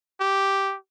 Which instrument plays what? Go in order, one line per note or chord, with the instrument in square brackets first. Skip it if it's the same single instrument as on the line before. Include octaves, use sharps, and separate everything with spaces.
[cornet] G4